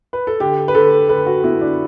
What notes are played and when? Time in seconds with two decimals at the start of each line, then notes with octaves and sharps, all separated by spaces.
0.13 B4
0.27 A4
0.40 D3 G4
0.68 B4
0.75 D3 A4
1.09 D3 B4
1.26 F#4
1.44 B3 E4
1.61 D4